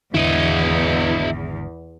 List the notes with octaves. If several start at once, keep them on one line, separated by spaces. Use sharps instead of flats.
G#1 E2 D3 E3 E4 D#5